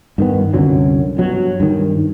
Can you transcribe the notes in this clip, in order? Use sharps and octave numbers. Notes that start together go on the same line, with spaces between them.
G2 D#3 B3
C2 F#2 D3 F#3
G2 B2 F#3
G2 D#3